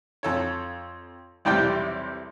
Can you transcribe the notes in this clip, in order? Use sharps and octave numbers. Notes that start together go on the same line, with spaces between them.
F2 A4 C#5
B1 E2 C3 G3 D5 G5